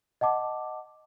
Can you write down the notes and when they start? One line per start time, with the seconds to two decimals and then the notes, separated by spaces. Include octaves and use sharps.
0.21 D#5 F#5 A5 D6